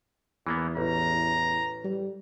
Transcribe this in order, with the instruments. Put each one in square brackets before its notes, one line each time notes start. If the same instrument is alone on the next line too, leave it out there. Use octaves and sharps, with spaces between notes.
[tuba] E2 [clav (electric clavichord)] E3 A#3 B3
[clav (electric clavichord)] A1 [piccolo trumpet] A#5
[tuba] G3